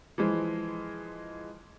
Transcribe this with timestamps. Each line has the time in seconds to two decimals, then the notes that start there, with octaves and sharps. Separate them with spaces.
0.18 E3 F3 G#3